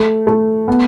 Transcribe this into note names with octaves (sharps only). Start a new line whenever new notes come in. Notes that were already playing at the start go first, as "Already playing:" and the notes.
Already playing: A3
A3
B3